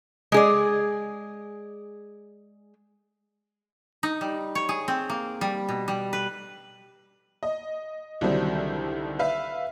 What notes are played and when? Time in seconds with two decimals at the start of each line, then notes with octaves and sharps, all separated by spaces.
0.32 G#3 G#4 D5
4.03 D#4
4.21 G3
4.55 C#5
4.69 G#4
4.88 C4
5.10 A#3
5.41 G3
5.69 B2
5.88 G3
6.13 B4
7.43 D#5
8.21 C2 D3 D#3 F#3 G3 C4
9.19 B4 E5 F5